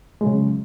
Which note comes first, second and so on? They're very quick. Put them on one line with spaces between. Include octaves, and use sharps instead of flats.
G#3 F#3 C#3